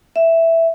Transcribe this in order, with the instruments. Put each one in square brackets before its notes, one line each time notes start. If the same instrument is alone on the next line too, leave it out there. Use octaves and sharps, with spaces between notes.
[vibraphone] E5